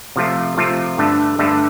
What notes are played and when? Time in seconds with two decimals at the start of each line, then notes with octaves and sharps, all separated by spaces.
0.16 C3 F3 A3 F4
0.57 C3 F3 A3 F4
0.98 G2 D3 A3
1.39 G2 D3 A3